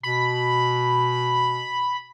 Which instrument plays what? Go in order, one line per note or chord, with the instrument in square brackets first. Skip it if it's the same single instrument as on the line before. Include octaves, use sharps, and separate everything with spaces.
[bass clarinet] B2 [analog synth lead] B5